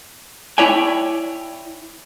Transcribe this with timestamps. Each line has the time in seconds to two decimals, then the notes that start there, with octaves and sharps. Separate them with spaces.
0.58 E4 C#5 D5 G5 G#5